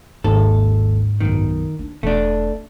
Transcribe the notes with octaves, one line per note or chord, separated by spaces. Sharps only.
G#1 D#2 G#2 A4
B1 F#2 D#3
D4
E1 A3 C4 D4